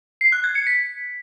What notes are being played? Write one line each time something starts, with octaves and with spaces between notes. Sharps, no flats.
C7
F#6
G#6
C#7
B6